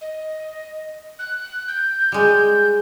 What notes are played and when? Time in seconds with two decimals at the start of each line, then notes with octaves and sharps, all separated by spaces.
0.01 D#5
1.19 F#6
1.68 G6
2.12 G3 G#3